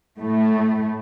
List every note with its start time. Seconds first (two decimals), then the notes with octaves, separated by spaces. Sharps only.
0.21 A2 A3